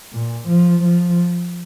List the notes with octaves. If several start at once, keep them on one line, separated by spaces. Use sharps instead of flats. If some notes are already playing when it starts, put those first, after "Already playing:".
A#2
F3
F3